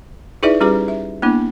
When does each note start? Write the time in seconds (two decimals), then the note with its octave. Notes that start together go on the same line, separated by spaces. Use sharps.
0.43 D#4 E4 G#4 B4 D5 E5
0.61 G3 C#4 F4 G4 G#4 B4
0.88 E5
1.22 A#3 B3 D4 E4